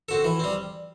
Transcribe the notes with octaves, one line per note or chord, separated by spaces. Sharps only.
C4 F#4 A4
E3
G3 C4